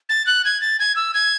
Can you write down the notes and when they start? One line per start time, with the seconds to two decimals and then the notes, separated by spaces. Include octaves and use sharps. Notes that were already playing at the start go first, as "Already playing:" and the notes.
0.09 A6
0.27 F#6
0.45 G#6
0.61 A6
0.79 G#6
0.96 E6
1.14 G#6